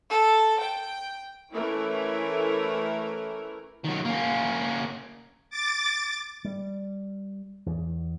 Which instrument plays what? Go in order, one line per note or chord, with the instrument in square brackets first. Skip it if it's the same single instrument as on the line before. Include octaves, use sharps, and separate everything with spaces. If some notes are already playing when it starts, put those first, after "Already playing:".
[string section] A4
G5
[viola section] E3 A3 C#4 E4 A#4
[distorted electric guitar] D#3 F#3
A#3 C#4
[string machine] D6 A6
[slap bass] G3
E2